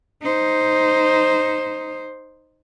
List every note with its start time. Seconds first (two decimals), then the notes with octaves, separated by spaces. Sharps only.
0.22 D#4 C5